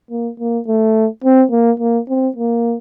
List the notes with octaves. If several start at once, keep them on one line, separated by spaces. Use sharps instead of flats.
A#3
A#3
A3
C4
A#3
A#3
C4
A#3